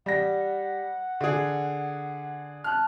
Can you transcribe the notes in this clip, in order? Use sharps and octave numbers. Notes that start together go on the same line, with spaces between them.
G3 F#5 A#6
D3 G#4
A5 F6 F#6